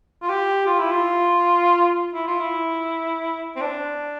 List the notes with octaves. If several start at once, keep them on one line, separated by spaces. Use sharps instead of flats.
F4
G4
F4
E4
F4
E4
F4
E4
C4
D4